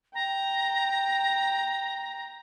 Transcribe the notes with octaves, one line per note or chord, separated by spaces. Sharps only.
G5 A#5